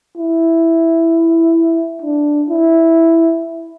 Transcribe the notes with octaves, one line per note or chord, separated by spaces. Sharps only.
E4
D4
E4